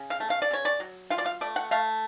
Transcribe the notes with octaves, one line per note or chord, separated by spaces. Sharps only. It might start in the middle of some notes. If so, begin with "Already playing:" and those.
Already playing: C#3
F5
A3
F5
D5
C#3 C#5
D5
F#3
F4 F5
D5
F5
A3 D5
F#5
A3 F5